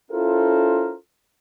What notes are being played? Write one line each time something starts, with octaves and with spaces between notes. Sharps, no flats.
C#4 E4 F4 A4 A#4 C5